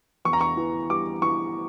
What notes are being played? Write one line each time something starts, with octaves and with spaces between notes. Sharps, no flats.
E2 C#6
A#5
C#6
E3
G3 D6
E3 C#6